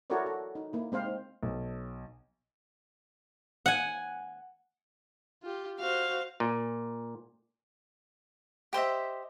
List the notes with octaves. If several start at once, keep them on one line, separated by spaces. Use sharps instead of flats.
E4 F#4 A4 A#4 C#5 D5
A4
D#4
A#3 E4
G#3 C4 C5 F5
D#4
B1
F#5 G#5
F4 G4
F#4 C5 F5
A#2
G4 C5 D#5 E5